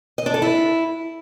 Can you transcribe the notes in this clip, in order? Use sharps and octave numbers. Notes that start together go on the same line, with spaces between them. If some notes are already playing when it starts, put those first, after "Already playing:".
D#5
D4
A4
E4